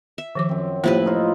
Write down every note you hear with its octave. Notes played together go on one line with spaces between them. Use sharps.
E5
D#3 F3 D6
F#2 C4
A2 F3 A#3 E4 G4 B4
D#4 F4 C5